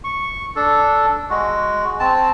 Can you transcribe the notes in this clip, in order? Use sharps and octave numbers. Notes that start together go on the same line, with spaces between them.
C#6
D4 A4
G#3 F#4
C4 A5